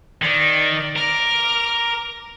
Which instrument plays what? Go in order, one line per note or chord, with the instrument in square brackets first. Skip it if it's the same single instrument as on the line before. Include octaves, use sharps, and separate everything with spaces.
[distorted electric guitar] D#3 [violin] D5
[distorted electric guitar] A#4 [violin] D6 F6